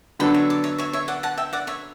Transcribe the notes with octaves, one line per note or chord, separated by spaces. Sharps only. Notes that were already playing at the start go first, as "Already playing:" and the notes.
D3 F#3 B3 D4 A4 G5 B5
C#5 E5
D5
C#5 E5
C#5 E5
C#5 E5
D5 F#5
F#5 A5
E5 G5
D5 F#5
C#5 E5